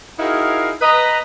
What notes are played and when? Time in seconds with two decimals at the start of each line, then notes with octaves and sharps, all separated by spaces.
0.19 D#4 E4 F#4 G#4 A#4 F5
0.81 B4 D#5 A#5